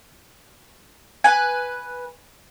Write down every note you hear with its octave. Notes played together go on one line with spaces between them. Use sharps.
B4 G#5